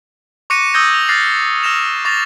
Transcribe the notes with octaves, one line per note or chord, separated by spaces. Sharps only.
C#6 D6 F#6 A#6 C#7 D#7
D#6 E6 G6 G#6 A#6 D#7
F7
D6 F6 F#6 A6 A#6 C7
E6 F6 A#6 E7 F7
C#6 D6 A6 A#6 F7